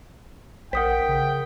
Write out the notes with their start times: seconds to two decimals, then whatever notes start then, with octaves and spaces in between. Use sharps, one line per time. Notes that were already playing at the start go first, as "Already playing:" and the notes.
0.73 A#1 A#4 C5 F#5 G5 D#6 B6
1.09 C#3